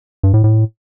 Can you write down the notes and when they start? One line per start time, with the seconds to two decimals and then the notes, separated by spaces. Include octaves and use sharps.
0.23 G2
0.34 A2
0.44 A2